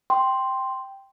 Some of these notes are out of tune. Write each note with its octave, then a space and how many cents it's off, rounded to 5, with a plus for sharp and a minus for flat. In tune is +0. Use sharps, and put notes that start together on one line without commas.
G5 +0 C6 +0